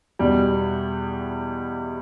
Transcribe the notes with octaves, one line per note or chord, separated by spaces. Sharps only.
E2 B2 G3